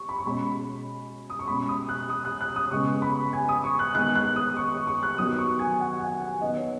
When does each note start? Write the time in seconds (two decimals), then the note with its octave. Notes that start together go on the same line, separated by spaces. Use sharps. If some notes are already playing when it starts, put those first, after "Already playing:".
Already playing: C#6
0.09 B5
0.18 C#6
0.25 B2 G#3 C#4 B5
1.30 D#6
1.39 C#6
1.47 B2 G#3 C#4 B5
1.68 D#6
1.89 F#6
2.09 D#6
2.25 F#6
2.41 F#6
2.56 D#6
2.71 C#3 G#3 B3 C#6
3.02 B5
3.33 G#5
3.49 D#6
3.64 C#6
3.79 F#6
3.95 D#3 G#3 B3 F#6
4.15 F#6
4.36 D#6
4.57 C#6
4.72 C#6
4.87 C#6
5.03 F#6
5.18 D#3 F#3 B3 D#6
5.39 C#6
5.59 G#5
5.80 F#5
6.00 G#5
6.21 G#5
6.42 D#3 B3 D#5
6.57 C#5